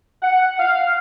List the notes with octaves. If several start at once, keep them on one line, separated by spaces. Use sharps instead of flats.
F#5
F5